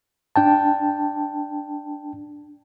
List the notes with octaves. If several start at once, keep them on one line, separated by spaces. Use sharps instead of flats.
D4 G5 A5